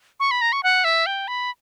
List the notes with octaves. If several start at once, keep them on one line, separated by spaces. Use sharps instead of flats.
C#6
B5
A#5
C#6
F#5
E5
G5
B5